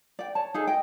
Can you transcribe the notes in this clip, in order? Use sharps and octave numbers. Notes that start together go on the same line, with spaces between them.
D5 G5
C#5 A5
D#4 G#4 A4
D#5 G5